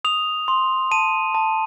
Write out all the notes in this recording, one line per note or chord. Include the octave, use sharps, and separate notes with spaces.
D#6 F7
C6
A5 D#7
A5